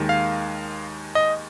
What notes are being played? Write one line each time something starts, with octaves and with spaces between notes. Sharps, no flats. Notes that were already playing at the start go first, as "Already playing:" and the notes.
Already playing: D#2 D#3 G#3
F5
D#5